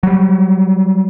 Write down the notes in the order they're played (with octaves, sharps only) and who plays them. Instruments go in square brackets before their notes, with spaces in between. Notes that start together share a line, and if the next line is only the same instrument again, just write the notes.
[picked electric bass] F#3 G3